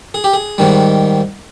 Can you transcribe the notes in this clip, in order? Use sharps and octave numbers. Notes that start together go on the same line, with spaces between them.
G#4
G4
G#4
G#2 D#3 G3